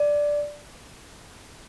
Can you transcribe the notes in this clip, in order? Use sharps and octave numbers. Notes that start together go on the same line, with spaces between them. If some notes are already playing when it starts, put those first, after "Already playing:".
Already playing: D5